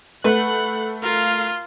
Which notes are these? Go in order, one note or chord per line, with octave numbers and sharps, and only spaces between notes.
A3 B4 F#5 F#6
F4 A#4 F5